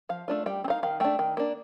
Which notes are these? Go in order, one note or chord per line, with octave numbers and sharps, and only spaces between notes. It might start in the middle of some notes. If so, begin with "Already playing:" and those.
F3 F5
A3 D4 F4
G3 G5
C4
D#4 F5
D#3 F5
A3 D4 G5
D#3
A#3 D4